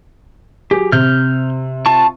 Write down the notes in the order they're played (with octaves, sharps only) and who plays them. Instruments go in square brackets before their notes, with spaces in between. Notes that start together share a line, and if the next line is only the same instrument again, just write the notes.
[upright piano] F#3 G#4 [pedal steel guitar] G4
[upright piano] C3 [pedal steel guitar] F6 G6
[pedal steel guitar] F4 A5 C#6